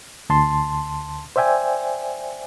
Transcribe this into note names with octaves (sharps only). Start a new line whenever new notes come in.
D2 A5 C6
C5 D5 E5 G5 G#5